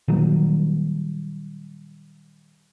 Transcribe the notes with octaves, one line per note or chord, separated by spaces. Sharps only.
A#2 D#3 F#3 G3